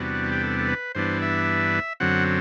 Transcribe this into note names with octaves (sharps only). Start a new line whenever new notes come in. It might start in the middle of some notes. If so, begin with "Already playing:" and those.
Already playing: E2 C3 G3 B3 D4 F#4
G4
A4
A4
B4
G2 E3 B3 D4 C5
E5
F#2 D3 F#3 C4 F#5